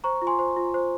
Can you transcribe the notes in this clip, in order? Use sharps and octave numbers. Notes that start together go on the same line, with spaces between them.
C5 A#5 C#6
F4
G#5 C6
C5
F4
C5